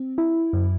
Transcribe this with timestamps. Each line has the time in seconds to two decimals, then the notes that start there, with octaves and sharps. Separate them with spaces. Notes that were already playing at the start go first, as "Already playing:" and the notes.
Already playing: C4
0.18 E4
0.53 F#2